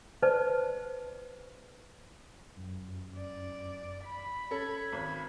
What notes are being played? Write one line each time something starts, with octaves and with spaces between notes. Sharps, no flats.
B4 C5 D5 A5
F#2
D5
B5
C#4 A4 G#6
G#1